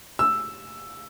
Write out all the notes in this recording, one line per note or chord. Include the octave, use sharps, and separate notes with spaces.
E6